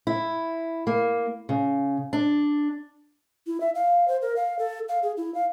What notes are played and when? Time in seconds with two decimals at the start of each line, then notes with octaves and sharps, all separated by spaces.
0.07 E4
0.87 A#3
1.49 C#3
2.13 D4
3.47 E4
3.60 E5
3.75 F5
4.08 C5
4.22 A#4
4.36 F5
4.59 A4
4.89 F5
5.03 G#4
5.17 E4
5.35 F5